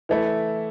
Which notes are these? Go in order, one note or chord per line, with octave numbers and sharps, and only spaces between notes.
E3 A3 E4